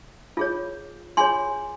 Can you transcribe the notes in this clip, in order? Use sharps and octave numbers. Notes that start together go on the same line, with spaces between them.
F4 G#4 C#5
F4 G#4 C#5 G#5 C6